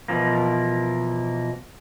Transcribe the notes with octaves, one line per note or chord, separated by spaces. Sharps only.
B2 E3 F3 A#3